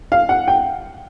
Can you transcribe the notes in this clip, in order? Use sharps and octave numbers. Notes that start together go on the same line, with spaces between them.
F5
F#5
G5